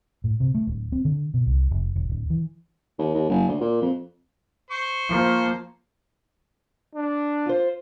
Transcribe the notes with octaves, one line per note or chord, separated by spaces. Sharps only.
A2
C3
A3
D1
C4
D3
B2
C2
F1
E1
D1
E3
D#2
D#2
F#1
D2
A#2
F2
C5 C#6
F3 A#3
D4
F4 C5